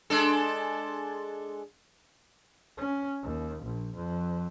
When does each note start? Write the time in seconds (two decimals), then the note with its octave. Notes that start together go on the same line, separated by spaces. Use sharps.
0.10 G#3 D4 A4
2.78 C#4
3.23 D#2
3.63 A#1
3.95 F2